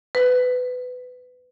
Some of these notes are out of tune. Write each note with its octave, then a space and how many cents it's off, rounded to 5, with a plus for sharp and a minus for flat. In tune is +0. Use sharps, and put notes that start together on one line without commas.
B4 +20